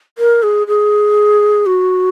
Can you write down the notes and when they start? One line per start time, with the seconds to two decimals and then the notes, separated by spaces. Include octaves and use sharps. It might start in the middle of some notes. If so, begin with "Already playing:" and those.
0.18 A#4
0.43 G#4
0.67 G#4
1.66 F#4